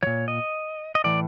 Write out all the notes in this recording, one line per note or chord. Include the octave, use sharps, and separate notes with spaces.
A#2 F3 C#5
D#5
D#5
A2 E3 D5